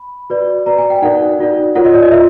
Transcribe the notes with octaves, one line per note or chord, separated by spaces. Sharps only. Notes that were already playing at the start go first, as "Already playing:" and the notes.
Already playing: B5
F#4 B4 D5
F#4 B4 D5 A#5
G#5
G5
D#4 F#4 A#4 D5 F#5
D#4 F#4 A#4 D5
F4 A#4 C#5 F#5
D#5
D5
D#5
F4 A#4 E5